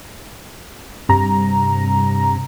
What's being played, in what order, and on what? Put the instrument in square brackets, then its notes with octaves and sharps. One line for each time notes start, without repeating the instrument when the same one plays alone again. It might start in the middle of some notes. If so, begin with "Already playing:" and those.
[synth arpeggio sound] G2 C3 A#5